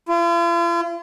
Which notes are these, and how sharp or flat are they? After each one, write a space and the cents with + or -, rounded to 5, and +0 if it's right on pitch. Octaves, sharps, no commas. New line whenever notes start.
F4 -45